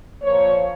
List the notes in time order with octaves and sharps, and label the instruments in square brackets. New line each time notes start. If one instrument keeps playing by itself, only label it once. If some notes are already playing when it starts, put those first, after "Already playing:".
[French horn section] A#2 F3 A#3 C#5